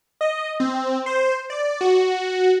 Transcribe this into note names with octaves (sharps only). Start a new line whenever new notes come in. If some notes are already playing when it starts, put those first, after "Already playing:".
D#5
C4
C5
D5
F#4